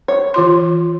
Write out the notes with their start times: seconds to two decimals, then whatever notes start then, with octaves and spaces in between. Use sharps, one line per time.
0.08 C#5
0.34 E3 F4 C6